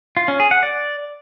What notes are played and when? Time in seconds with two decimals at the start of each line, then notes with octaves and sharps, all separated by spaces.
0.17 F4
0.28 C#4
0.40 G#4
0.51 F#5
0.63 D5